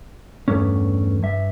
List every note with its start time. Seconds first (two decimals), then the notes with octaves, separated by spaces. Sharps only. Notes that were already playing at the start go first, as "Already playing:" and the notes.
0.48 E2 G2 A3 C#4
1.23 G2 E5